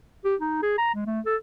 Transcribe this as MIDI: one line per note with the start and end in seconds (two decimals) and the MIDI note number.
0.24 0.35 67
0.40 0.59 63
0.63 0.75 68
0.78 0.94 82
0.95 1.04 56
1.06 1.20 57
1.26 1.36 69